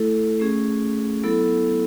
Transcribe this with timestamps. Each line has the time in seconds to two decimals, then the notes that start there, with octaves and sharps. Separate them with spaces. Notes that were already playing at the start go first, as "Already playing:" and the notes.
Already playing: A3 E4 A4
0.40 A3 C#4 G#4
1.24 F#3 B3 E4 A4